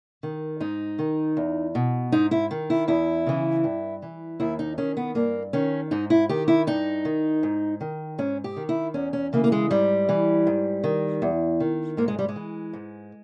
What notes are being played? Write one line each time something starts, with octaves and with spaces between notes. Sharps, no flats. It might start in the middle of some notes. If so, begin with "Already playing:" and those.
D#3
G#2 D#4
D#3
E2
B2
G#2 D#4
E4
D#3
E4
E2 E4
C#3 E3
G2
E3
D#2 E4
D#4
D#3 C#4
B3
G2 A#3
D#3 C#4
G#2 D#4
E4
D#3 G4
E4
G2 D#4
D#3
G#2
D#3
G#2 C#4
G4
D#3
E4
E2 C#4
C#4
C#3 E3 A#3
A#3
G#3
G#2 G3
E3
G#2
D#3
E2
D#3
G#2 A#3
G#3
G3
G#3
E3
G#2